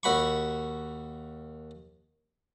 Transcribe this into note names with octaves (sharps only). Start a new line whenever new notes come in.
D#2 F#4 B5 C#6